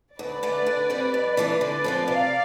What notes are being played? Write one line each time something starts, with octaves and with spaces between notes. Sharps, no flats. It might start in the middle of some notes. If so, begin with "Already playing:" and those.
D2 B4 D5
D3 A3
D3
G3 C4
F2
E3 A3 D4 F4
D3 B4 D5
F3 C4 F4
C3 D5 F5